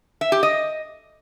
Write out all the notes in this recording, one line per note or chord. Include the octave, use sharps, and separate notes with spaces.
E5
G4
D#5